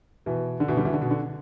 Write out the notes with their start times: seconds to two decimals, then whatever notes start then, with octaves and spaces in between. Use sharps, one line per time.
0.26 B2 E3
0.60 D3
0.68 B2 E3
0.77 D3 G3
0.85 B2 E3
0.93 D3
1.01 B2
1.10 D3